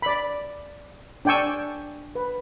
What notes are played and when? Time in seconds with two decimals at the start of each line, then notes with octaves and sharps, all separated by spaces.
0.02 D5 B5
1.25 D4 D5 G5 G#5 C#6 E6
2.15 B4